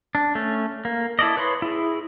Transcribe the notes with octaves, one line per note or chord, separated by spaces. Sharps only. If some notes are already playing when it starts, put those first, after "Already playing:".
D4
A3 C#4
A#3
E4 A4 D5 D#5
B4 C#5 B5 C6
E4 G#4